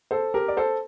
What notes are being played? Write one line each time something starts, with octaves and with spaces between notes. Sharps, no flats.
A4 C5
G4 A#4
D5
A4 C5